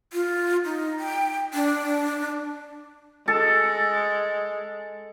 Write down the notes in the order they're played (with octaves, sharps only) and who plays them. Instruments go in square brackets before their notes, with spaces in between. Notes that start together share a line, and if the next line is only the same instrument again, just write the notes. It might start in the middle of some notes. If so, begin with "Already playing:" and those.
[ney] F4
D#4
G5
D4
[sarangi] G#3 [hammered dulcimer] A4